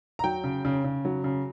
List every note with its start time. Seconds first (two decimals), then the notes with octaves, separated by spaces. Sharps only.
0.19 A#5
0.24 F#3 G5
0.44 C#3
0.65 C#3
0.84 C#3
1.05 F#3
1.24 C#3